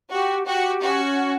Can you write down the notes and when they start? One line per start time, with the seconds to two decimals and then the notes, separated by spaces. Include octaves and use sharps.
0.11 F#4 G4
0.46 F#4 G4
0.81 C#4 F#4
1.16 F#5